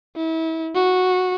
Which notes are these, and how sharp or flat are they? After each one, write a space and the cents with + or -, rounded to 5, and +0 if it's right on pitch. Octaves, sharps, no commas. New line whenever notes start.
E4 -35
F#4 -10